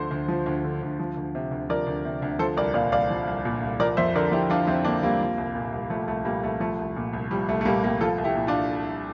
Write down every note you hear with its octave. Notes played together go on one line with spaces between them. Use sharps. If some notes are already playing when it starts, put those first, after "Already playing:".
Already playing: D2 D3 F3 C5
D2
F3
D2
D3
D2
F3
D2
C3
D2
F3 A#4 D5
D2
C3
D2
F3 A4 C5
C2 A#4 D5
A#2 D5 F5
C2 D5 F5
F3
C2
A#2
C2
F3 A#4 D5
F2 C5 E5
D3 A#4 D5
F2 E4 G4
F3 D4 F4
F2 C4 E4
D3 A#3 D4
F2 G3 A#3
F3
C2
A#2
C2
F3 A3
C2 A3
A#2 G3 A#3
C2 A3
F3 A3
C2
A#2
C2
F3 G3
C2 A3
A3
A#2 G3 A#3
C2 G3 A#3
F3 F4 A4
C2
E4 G4
A#2
D4 F4